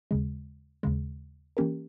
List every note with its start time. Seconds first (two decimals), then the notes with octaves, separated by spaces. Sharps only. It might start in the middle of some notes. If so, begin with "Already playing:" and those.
0.11 D#2 C#3 G#3
0.83 D#2 C#3 G#3
1.57 E3 A#3 C#4 G4 A#4